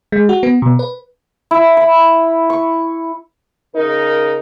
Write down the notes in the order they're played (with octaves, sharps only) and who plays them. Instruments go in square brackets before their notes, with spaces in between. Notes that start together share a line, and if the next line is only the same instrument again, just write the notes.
[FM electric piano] G#3
F#4
B3
B2
B4
[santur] E4
B5
C#6
[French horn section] C#3 D#4 A#4